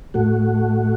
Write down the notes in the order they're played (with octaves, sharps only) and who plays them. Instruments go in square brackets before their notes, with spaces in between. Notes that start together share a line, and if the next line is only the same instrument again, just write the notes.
[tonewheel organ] A2 A3 F#4